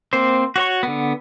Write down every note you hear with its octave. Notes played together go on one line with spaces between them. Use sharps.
A#3 C4 C5
F#4 C#5 C#6
D3 B3